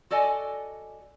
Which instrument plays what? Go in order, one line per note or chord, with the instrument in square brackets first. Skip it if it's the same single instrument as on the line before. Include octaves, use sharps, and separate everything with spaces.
[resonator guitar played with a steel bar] F#4 A4 D5 D#5 G#5